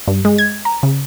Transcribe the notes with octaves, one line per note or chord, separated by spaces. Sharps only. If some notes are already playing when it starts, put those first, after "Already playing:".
G2
G#3
G#6
A#5
C#3